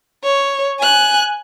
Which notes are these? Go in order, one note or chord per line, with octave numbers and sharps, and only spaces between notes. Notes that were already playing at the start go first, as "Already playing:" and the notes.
C#5
G#5 F#6